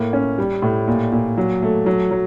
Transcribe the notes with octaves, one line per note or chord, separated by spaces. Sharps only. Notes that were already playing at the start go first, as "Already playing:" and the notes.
Already playing: A2 A#3
C#4
G3
A2
A#2
A#2
F#3
A3
F#3
F#3